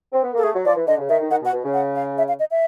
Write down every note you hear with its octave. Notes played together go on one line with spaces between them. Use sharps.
C4
B3
A#3 A4
A3 G#4
F#3
F3 D5
E3
D3 D#5
C#3
D#3 E5
D#3
D#3 F#5
B2
F#5
B2
C#3
F#5
F5
E5
F5
D#5
E5